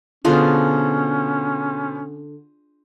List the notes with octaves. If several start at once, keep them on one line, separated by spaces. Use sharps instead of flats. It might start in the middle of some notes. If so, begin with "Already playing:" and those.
B2 D3 B3 C#4 F4 G#4 C5